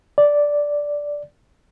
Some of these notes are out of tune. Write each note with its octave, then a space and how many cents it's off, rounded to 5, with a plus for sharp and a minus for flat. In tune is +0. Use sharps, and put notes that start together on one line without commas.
D5 -5